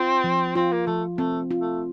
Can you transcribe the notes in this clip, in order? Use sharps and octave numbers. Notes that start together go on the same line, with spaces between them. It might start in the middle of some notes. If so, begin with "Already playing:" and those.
Already playing: C4 F4
F3
C4 F4
A#3
F3 A3
A3 C4
F4
A3